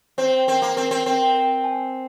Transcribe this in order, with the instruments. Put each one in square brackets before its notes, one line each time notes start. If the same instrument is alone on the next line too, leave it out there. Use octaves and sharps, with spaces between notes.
[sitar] C4 [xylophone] C5
[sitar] C4 [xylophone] A#4
[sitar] A#3
[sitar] C4 [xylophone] A#4
[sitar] C4
[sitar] C4 [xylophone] A#4
[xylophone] A#4
G#5